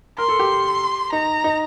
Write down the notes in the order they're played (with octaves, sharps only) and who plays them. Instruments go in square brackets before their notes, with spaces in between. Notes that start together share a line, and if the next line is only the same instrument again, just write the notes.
[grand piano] A#4 [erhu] C6
[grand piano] A4
G4
[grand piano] D#4 [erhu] A#5
[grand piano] D#4